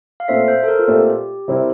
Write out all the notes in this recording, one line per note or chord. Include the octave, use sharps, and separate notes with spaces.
F5
A#2 A3 C4 E5
C5
A4
A#4
F4
A#2 A3 C4 G4
C3 G3 C4 E4 A#4